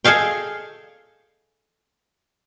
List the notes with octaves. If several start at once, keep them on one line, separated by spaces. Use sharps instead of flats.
G#4 A4 D#5 F5 G5